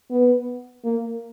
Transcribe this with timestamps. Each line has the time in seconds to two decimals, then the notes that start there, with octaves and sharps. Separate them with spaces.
0.11 B3
0.85 A#3